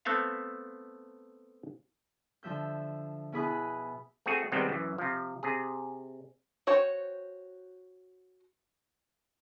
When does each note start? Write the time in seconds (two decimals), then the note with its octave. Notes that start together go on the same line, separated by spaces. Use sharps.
0.05 A3 B3 C4 A4 E5 F5
2.43 D3 F3 E5 G6
3.32 B2 E4 G#4 B5 D#6 F#6
4.26 A3 C4 F#4 G#4
4.52 C3 D#3 G3 G#3 B3 C4
4.69 F#2 E3
4.98 C3 F3
5.43 C3 G#4
6.67 F#4 C5 C#5 G5